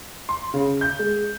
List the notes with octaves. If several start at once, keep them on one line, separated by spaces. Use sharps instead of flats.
C6
C#3
G6
G#3